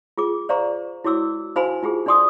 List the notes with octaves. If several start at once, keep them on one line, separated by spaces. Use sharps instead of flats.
F4 G#4 D6
C5 D5 F5 A#5 C#6
E4 F#4 C#5 D6 E6
D#4 F#4 C5 F5 G#5 B5
D#4 F4 G4 G#4
D4 D#4 D5 C6 D6 D#6